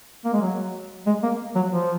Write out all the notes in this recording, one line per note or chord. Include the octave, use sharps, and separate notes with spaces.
A#3
G#3
F#3
G#3
A#3
F#3
F3